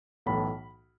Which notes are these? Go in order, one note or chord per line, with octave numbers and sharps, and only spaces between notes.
B1 A2 E3 B5